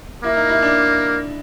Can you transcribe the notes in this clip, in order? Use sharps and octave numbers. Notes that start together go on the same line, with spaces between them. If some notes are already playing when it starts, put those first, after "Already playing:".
A#3 E4
D#4
E4
D4